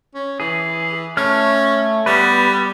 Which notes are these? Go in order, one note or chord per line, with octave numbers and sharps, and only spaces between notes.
C#4
E3 G#4
A3 C#4 F6
G3 B3 B4